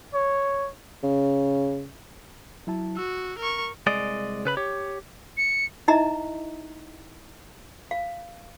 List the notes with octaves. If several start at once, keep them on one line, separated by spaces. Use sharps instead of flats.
C#5
C#3
F#3 E4 A5
F#4 E6
A#4 C#6
C2 G#3 D5 D#5
C#3 B4 B5
G4 C#5
C#7
D#4 E4 D#5 E5 A#5
F5